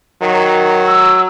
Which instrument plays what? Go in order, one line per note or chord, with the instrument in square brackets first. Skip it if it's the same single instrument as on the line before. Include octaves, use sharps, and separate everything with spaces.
[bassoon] D#3 [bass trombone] F#3
[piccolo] E6